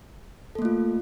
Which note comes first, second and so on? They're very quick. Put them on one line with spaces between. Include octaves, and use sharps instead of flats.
A4 A#3 A3 F4